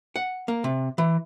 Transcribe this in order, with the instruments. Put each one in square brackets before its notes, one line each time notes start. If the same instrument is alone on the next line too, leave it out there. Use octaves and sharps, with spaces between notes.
[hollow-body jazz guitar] F#5
A#3
C3
E3